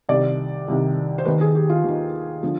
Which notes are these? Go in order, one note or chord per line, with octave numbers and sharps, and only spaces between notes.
C2 C3 D#3 D5
C2 C3 D#3
C5
D#2 D#3 B4
G#4
G4
F4
D#2 D#3
D3 F3